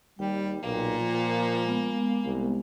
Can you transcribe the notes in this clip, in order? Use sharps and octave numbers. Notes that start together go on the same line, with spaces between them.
D#2 G3 G5
B1 A#2 A#3
F3
G#3 B3
C2